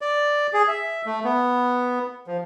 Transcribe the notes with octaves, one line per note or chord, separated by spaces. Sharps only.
D5
G#4
E5
A3
B3
F3